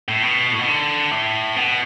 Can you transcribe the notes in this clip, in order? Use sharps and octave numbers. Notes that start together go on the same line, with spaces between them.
A2
B2
A2
B2
D3
A2
B2